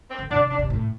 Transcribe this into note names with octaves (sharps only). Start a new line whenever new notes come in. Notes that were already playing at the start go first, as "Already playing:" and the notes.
C4
D3
C3 D4
D3 D4
C3
A2